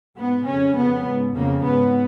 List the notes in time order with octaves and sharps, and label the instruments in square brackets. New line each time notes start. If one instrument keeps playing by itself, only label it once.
[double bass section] G#2 B3
F2 C#3 C#4
F2 C#3 B3
G#2
F2 C#3 A#3
G#2 B3